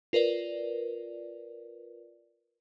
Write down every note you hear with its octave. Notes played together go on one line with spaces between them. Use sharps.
F4 A#4 B4 D5